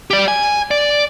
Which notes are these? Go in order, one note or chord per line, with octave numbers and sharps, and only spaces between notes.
G4 D5
G#5
D5